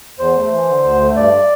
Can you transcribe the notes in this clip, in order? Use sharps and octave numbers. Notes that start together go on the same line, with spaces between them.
E2 C5
A3
E3
D3
D2
A3
G2 D5